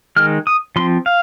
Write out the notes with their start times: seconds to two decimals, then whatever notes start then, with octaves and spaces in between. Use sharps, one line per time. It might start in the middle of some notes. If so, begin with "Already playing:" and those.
0.16 D#3 G#3 F6
0.47 D#6
0.76 F3 C4 C6
1.06 F5